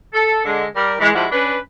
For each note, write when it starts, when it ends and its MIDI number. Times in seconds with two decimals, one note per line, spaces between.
0.13 0.42 69
0.45 0.64 50
0.45 0.64 56
0.75 0.94 55
0.75 0.94 70
1.00 1.09 52
1.00 1.09 56
1.14 1.26 53
1.14 1.26 55
1.14 1.26 56
1.14 1.26 64
1.14 1.26 66
1.31 1.57 61
1.31 1.57 62
1.31 1.57 71